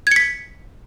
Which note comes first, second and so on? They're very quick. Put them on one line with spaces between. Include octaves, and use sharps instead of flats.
G#6 C#7 B6